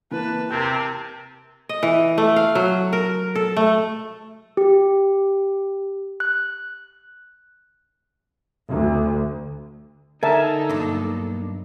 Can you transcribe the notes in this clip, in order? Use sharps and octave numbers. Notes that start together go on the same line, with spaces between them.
E3 A#3 B4 A5
C3 C4 A#4 A5 G6 G#6
D#5
E3
A3
F5
F#3
A#4
A4
A3
G4
F#6
D2
D3 D#4 A4 A#4 E5 G#5 A5
B1 G2 A#3 D4